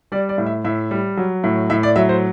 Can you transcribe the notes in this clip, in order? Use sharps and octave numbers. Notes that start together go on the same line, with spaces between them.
G3 D5
D5
A2
E5
A2 E5
G3
F#3
A2
A2 E5
D5
F#3 E5
C5